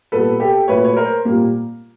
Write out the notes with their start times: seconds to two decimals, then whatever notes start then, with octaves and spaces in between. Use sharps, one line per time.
0.12 A#2 G3 B3 A4 B4
0.40 G4 A4
0.68 A#2 F#3 A3 B4 C#5
0.84 C#5
0.96 A#4 C5
1.25 A#2 G3 A#3